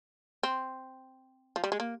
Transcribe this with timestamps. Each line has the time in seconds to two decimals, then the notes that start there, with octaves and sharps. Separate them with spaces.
0.43 C4
1.56 F3
1.64 G3
1.72 G#3
1.80 A#3